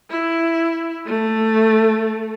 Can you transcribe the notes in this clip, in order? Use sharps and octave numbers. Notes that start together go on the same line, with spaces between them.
E4
A3